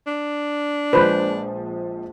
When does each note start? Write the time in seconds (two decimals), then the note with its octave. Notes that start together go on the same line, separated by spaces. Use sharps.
0.07 D4
0.93 A#1 F3 G#3 B4 C5